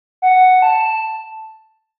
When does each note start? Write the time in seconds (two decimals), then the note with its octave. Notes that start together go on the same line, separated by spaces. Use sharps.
0.22 F#5
0.62 A5